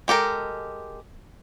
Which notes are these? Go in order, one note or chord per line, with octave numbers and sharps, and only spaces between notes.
G#3 G4 A4 A#4